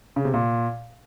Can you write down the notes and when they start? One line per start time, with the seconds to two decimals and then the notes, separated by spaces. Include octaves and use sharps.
0.16 C#3
0.25 C3
0.34 A#2